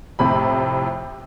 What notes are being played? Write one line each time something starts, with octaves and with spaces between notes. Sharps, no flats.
F2 A2 C3 B5